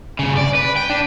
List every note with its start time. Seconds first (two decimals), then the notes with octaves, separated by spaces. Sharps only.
0.19 G2 C#3
0.37 D5
0.55 B4
0.77 G5
0.90 D4